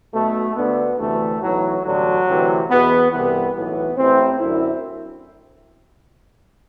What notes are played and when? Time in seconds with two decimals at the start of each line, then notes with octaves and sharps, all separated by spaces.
0.14 B1 B2 A3
0.56 D2 D3 B3
0.99 D2 C3 E3 A3
1.41 B1 A2 E3 F#3
1.84 A1 G2 D3 F#3
2.27 D2 C3 E3
2.70 E2 B2 B3
3.12 C2 C3 E3 B3
3.55 B1 A2 E3 B3
3.97 A1 A2 E3 C4
4.40 F#2 D3 E4